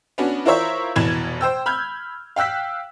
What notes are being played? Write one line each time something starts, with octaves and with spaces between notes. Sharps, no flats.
B3 C#4 D4 F#4
E4 F4 A#4 C5 C#5 E5
F1 B2 E3 G#6 E7
C5 G5 E6
B5 F6 G6 G#6
F5 G5 E6 F#6 B6